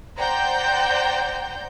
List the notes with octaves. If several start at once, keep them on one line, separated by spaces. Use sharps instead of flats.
C5 D5 F#5 G5 A#5 G6